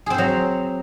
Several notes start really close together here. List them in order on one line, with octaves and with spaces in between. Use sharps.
G#4 C4 C5 F#3